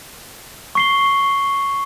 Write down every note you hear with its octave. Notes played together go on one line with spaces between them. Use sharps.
C#6 C7 G7